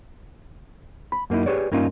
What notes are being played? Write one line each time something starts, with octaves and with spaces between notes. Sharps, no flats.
B5
F#2 A#3 D#4 E4
G4 G#4 B4 C#5 D5
G2 A#3 C#4 D#4 F4